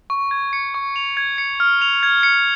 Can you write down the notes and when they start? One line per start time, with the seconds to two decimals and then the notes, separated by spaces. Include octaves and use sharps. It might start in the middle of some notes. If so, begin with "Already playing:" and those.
0.10 C#6
0.31 G#6
0.53 C#7
0.74 C#6
0.96 F7
1.17 G#6
1.38 C#7
1.60 F6
1.81 F7
2.03 G#6
2.23 C#7